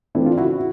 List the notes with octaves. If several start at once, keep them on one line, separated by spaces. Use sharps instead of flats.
E3 A3 C4 D4 E4
F4
C#3 E4 F#4